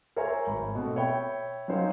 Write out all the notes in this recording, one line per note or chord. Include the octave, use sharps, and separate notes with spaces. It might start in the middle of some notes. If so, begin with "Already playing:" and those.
A#4 C5 C#5 E5 G#5 A#5
G#1 B5
B2 A3 C4
C#5 E5 G5 B5
F#3 C#4 D#4 C5 C#5 F5